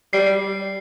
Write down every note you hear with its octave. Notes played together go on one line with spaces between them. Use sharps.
G3 C7